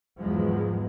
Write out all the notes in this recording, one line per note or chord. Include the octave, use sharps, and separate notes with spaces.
E2 G#2 D#3 F3 F#3 G#3